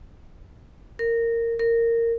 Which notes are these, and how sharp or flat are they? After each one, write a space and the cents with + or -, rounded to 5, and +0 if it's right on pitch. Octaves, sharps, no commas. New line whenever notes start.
A#4 -15
A#4 -15